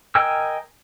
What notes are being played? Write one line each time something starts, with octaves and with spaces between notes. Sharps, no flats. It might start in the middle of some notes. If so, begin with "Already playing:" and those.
A#4 D#5 G5 G#5 E6